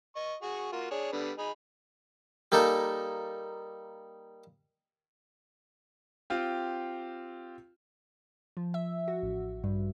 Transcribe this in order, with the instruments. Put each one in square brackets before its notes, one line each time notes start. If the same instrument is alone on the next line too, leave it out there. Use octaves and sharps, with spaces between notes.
[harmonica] D#5 C#6
F#4 G#4 C#6
A#3 F4 F#4
D4 G#4 C#5
D3 G3 B3
D#4 G#4 B5
[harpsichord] G3 A#3 D#4 A4
[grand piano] C4 F4 G4
[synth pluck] F3
E5
F#4
A1
G2